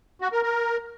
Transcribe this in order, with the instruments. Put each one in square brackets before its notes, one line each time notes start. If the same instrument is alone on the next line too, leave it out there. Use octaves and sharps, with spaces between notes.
[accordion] F#4
A#4
A#4